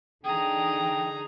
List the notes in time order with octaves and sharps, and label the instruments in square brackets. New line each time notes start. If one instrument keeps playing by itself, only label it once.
[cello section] D3 E3 D#4 [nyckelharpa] G#4 A#5 [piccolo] G5